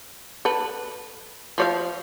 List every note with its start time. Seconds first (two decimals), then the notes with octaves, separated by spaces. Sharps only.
0.45 A4 B4
1.58 F3 C#5 F5